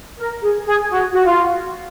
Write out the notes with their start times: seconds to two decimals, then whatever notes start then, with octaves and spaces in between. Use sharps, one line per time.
0.18 A#4
0.41 G#4
0.65 G#4
0.89 F#4
1.12 F#4
1.24 F4